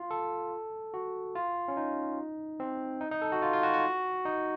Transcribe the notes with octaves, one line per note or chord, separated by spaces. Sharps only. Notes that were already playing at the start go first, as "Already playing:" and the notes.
Already playing: F4
A4
F#4
F4
C#4
D#4
C4
D#4
D#4
A4
F#4
F4
F4
F#4
F#4
D#4